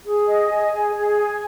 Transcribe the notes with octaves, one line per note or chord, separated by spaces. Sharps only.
G#4
D#5
G#5
G#4
G#4
G#5